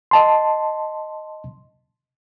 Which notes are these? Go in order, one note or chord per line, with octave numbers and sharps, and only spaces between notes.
D#5 A5 C6